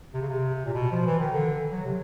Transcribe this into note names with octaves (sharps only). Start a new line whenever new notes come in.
C3
C#3
C3
A#2
B2
F3
E3
D#3
D3
F#3
C3